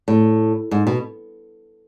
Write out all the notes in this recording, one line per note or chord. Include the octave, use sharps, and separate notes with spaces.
A2
G#2
B2